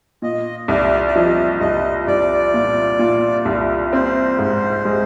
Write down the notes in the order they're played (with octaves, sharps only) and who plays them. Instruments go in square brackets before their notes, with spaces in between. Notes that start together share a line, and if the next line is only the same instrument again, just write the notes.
[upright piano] A#2 [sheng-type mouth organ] D#5
[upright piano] C2 [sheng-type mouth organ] D5
[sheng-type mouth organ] D5
[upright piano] F3 [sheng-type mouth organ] D#5
[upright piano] C2 [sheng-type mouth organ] D#5
[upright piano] C2 [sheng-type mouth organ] D5
[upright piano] A#2
A#2
C2
[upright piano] C4 [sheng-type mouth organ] C5
[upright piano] G#2
G#3